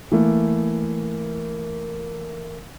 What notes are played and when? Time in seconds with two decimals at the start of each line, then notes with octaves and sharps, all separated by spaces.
0.12 E3 A3 A#3